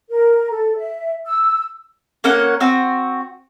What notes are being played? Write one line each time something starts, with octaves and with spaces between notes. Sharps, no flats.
A#4
A4
E5
E6
A#3 C#4 F#5
C4 F#4